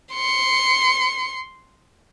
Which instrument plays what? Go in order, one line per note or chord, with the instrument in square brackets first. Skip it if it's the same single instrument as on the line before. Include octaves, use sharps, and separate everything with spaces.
[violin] C6 C#7